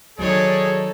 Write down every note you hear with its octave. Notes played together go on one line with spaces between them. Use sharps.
D#3 F#3 D#4 G#4 A4 C#5 D5